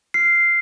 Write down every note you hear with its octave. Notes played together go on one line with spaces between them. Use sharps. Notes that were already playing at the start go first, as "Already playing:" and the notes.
F6 C7